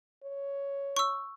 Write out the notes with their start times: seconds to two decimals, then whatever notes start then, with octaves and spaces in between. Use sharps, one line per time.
0.24 C#5
0.97 C#6 E6